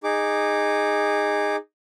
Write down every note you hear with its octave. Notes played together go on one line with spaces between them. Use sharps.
D#4 G#4 D6